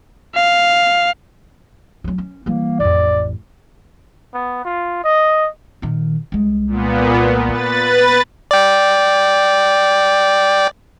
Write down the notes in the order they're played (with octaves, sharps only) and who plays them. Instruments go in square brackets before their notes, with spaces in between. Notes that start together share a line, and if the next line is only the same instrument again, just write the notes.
[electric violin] F5
[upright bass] F#3 C#4
C#4
[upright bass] E3 G3 [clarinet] A#3
[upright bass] A1 F2 [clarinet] D5
[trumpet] B3
F4
D#5
[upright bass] A#2 D#3
C2 G#3
[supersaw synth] A#2 B3
[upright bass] B3 [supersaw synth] B4 A6
[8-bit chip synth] D5 G5